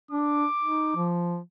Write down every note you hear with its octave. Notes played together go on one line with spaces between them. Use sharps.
D4 D6
D#4
F3